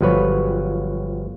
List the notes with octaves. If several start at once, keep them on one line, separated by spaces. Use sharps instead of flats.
G1 F3 F#3 B4 C#5